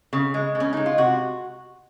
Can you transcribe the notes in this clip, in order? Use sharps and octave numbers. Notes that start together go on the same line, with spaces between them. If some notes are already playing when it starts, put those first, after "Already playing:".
C#3
G#3
C#3
C#4
G#3 D#4
F4
C3 F#4